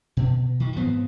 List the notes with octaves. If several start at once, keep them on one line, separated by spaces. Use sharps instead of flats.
B2
D#3
G#2 F3 B3 C4